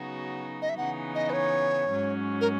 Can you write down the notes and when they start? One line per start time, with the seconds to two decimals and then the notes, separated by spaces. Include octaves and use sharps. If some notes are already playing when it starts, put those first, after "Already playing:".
Already playing: C#3 F#3 B3 D#4 F#4
0.62 D#5
0.69 E5
0.77 C#3 E3 B3 D#4 F#5
1.15 D#5
1.30 B4
1.33 C#5
1.90 G#2 F#3 C#4
2.41 A#4